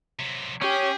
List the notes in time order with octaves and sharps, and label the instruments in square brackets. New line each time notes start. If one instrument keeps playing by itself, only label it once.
[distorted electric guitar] C3 F#3
[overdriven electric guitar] C#4 [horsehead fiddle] G4 [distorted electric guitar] G#4